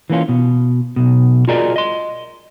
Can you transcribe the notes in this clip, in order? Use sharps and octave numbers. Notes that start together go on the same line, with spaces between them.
E3 A#3 C#4 F4
B2
B1 B2
F4 F#4 G#4 A#4 D5 D#5
D#5 C6